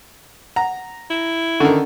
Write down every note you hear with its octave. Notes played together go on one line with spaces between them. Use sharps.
F#5 A#5
E4
D3 D#3 C#4 A4 F#5